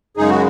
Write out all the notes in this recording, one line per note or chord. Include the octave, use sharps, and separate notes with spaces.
F#2 C#3 G#3 D#4 G#4
F#4